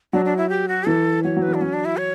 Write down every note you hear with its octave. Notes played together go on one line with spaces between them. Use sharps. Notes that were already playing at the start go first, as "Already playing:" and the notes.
F#3 D4
D4
E4
G4
F#4
E3 A4
F#3 C#5
F#3
B4
E3
D4
F#3 C#4
D4
E4
C#5